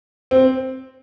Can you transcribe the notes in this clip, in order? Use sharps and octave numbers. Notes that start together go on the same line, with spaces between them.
C4